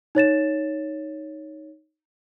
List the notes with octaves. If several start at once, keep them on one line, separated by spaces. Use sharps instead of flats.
D#4 C#5 A6 E7